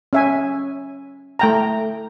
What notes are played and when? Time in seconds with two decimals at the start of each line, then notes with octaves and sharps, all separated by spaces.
0.13 C#4 E5 G#5
1.39 A3 G5 A#5